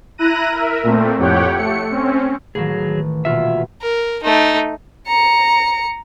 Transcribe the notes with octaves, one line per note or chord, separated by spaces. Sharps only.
E4 A#5 F#6 A#6 D#7
A#4 E5
A#2 A3 C4
F2 A2 G4 C#5 F#5 G5
A3 C#7
C4 C#4
A1 D#3 F#3 G#4
D#1 B2 F4 E5
A#4
A3 D#4
A#5 C#7